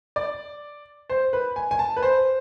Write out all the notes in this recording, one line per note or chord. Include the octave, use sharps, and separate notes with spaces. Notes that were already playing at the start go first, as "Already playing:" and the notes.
D5
C5
B4
G#5
G#5
A5
B4
C5